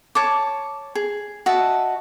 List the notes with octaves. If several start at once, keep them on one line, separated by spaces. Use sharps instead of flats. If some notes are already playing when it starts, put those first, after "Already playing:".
C#5 A5 D6
G#4
F#4 D#5 E5 A5